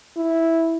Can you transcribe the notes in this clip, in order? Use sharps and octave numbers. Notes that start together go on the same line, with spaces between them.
E4